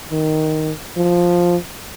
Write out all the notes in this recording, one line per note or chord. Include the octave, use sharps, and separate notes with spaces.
D#3
F3